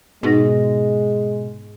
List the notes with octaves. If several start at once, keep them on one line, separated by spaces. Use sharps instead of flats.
G#2 B2 G#3 D#4 A#6